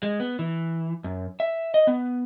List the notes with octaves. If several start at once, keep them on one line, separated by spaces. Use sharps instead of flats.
G#3
B3
E3
F#2
E5
D#5
B3